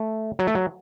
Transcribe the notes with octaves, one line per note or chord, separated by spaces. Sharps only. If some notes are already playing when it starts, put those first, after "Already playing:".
Already playing: A3
F#3
A3
F#3